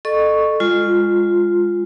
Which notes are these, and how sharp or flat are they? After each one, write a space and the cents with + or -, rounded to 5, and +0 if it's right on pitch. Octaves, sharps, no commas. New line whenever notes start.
A4 +0 D#5 -35 C#6 +0
G#3 -25 F4 +0